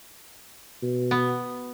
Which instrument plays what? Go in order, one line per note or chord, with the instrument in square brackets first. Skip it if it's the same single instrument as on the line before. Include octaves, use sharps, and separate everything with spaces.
[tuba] B2
[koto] B3